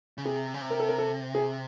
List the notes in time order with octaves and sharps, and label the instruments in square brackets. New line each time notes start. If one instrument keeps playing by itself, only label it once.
[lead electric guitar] C#3
[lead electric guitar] C3 [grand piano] G#4
[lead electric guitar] C#3
C3
[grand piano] A#4
A4
A#4
A4
G#4